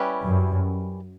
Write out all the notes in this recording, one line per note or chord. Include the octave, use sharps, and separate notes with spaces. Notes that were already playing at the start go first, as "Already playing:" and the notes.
Already playing: G3 C#4 E4 G4 B4
F#2